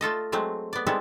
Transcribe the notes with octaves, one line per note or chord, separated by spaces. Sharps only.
A3 F4 A4 D#5
F#3 G#3 A3 C4
B3 D5
G3 G#3 B3 C4 E4 A4